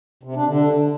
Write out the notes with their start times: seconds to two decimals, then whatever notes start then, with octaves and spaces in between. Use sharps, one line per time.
0.23 C3
0.35 D4
0.47 D3